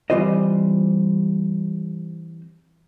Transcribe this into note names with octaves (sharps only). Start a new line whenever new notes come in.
E3 G3 C4 F4 C5 D#5